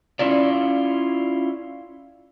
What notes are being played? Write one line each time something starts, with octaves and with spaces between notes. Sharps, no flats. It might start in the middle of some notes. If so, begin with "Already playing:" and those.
C#4 E4 F4 D5